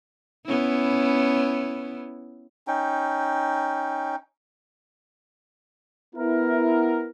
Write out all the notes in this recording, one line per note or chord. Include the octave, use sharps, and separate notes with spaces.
B3 C#4 E4
C#4 D#4 G5
B3 E4 A#4